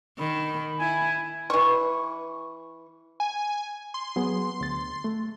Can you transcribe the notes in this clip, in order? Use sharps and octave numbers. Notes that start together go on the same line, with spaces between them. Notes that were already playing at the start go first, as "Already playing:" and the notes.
D#3 B5
E4 G#5
E3 C#6
G#5
C6
F#3 B3 G#4
D2 A6
A3